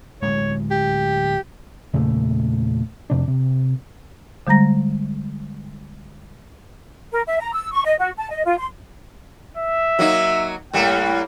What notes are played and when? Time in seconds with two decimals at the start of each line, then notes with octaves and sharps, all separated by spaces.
0.22 D1 G#3 C#5
0.71 G4
1.93 E2 A#2 C#3 A3
3.10 F2 C3 D4
3.28 C3
4.47 D3 G3 G#3 A#5 A#6
7.12 A#4
7.27 E5
7.40 A#5
7.54 E6
7.72 C#6
7.84 D#5
7.99 F#4
8.18 A5
8.29 D#5
8.45 F4
8.58 C6
9.57 E5
9.99 F#3 A#3 D#4
10.73 A2 G3 A#3 F#5